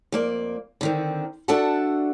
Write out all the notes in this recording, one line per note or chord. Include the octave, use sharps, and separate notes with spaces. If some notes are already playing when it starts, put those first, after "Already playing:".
F2 A#3 D5
D3 D#3 C4
D4 F#4 A4 E5 F#5 A5